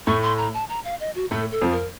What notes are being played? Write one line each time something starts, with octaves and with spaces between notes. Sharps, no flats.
A2 A3 C#6
C6
A#5
A5
A#5
F5
D#5
F#4
A2 A3 A4
A4
F2 F3
A#4